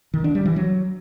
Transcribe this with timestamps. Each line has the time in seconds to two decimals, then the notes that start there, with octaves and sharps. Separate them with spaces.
0.14 D#3
0.24 D4
0.35 G3
0.46 E3
0.56 F#3